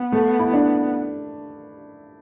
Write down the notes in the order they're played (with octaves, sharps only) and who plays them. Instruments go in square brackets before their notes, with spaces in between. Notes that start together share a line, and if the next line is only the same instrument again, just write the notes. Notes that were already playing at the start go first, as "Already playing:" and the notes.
Already playing: [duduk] B3
[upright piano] A3
E4
D4